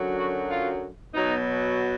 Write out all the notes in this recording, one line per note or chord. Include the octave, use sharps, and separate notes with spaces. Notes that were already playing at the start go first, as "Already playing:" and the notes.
Already playing: F#2 D3 F#3
F#4
F4
B2 F#3 D#4